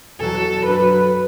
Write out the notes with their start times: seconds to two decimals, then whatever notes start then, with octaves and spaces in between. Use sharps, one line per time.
0.18 E2 B2 F#3 A4
0.65 F#2 D3 F#3 B4